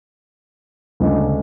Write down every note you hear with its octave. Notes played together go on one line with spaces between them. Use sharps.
D2 C#3 G#3 D4